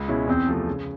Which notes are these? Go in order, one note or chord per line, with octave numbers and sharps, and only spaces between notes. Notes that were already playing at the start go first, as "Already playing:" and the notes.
Already playing: C#2
B2 G#3 C#4 E4
E2 C4
C3 F3 A3
C#3